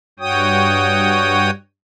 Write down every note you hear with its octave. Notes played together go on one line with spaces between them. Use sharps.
G2 F#4 C#5 G5 D#6